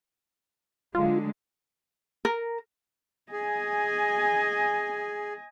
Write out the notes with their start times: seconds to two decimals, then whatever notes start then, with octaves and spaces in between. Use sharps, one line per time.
0.95 D3 F#3 G#3 F4
2.25 A#4
3.32 G#4 D#5 G#5